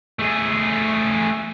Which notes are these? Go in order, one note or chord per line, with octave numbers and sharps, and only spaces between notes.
A3 G#4